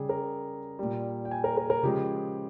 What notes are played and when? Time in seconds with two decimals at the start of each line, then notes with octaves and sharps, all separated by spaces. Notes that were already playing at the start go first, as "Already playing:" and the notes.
Already playing: C#3 G3 G4 G#4
0.09 A#4
0.79 A#2 G3
1.25 G5
1.31 G#5
1.44 A#4
1.57 A#4
1.70 A#4
1.83 C#3 F3 G#3 G4